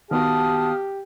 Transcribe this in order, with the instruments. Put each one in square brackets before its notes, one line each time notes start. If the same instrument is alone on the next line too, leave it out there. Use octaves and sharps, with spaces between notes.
[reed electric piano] D#3 B3 F#4 [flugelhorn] G4 [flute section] F5 D#6 F6 [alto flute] A5